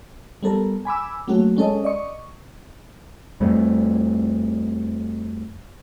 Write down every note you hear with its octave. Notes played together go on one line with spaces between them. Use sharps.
G3 B3 A4 A#4
G#5 B5 D6 E6
F#3 A3 A#3 C#4 F#4
G#3 C#4 A4 D#5
D5 D#5 C#6
F2 G3 A3